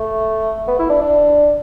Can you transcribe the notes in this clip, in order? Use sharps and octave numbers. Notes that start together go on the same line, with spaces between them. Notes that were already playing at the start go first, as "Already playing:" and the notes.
Already playing: A3
B3
E4
D4
D4